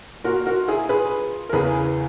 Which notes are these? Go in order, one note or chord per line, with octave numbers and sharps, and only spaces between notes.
A#2 F#4 A#4
F#4 A#4
E4 G#4
G#4 B4
A#4
E2 C#3 E3 G#4 B4